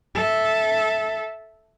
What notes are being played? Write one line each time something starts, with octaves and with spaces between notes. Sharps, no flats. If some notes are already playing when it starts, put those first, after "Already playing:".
A4 E5